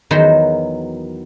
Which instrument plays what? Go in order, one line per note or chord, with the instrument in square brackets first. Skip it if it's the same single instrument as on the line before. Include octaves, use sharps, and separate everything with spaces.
[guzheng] E2 D#3 F#3 C5